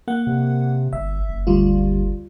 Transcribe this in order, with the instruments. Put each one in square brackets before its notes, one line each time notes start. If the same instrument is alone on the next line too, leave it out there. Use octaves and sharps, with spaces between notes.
[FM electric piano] A#3 F#5
[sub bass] C3
[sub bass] G1 [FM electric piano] E5
[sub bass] F#1
[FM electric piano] D2 G3 F4